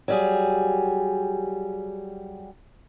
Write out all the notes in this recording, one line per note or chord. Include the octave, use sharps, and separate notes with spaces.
F#3 G3 G#4